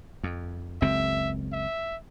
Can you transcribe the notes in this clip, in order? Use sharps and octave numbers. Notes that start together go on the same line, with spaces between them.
F2
F#1 C#2 C4 E5
E5